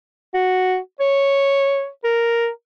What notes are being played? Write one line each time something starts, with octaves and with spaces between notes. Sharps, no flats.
F#4
C#5
A#4